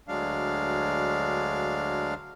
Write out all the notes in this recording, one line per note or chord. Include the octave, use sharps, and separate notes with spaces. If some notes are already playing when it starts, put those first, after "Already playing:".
D2 F#3 G#3 D4 F5